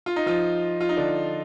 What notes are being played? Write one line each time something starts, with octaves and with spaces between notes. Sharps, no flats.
F4
D#4
F3 F4
F4
D#4
D3 D4